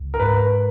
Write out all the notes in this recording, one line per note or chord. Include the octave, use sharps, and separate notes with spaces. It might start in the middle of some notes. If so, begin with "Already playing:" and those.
Already playing: C#2
A#4
G#2 B4